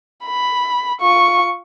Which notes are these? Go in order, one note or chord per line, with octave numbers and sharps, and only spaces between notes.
B5
F4 C#6